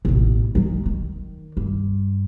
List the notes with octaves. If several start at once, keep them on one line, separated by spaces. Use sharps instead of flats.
A1 B2
F#3 G#3
D#3
G2